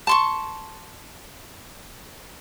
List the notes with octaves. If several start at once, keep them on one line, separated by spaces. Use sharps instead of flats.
A5 C6 C#6